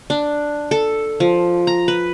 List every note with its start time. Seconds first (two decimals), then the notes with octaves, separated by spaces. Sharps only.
0.10 D4
0.71 A4
1.20 F3
1.67 A#5
1.88 B4